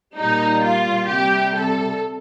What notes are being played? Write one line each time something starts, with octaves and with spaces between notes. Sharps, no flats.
A#2 G3 D#4
F4
C3 G3 G4
A4